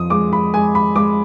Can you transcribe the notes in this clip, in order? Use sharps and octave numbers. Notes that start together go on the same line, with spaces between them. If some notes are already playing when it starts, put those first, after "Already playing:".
Already playing: F2 D#6
G#3 D6
B5
G#3 G#5
B5
G#3 D6